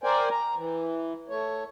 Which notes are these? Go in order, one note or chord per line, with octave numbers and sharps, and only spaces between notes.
A#4 C5 D5 G5 G#5
A#5
E3
A3 C#5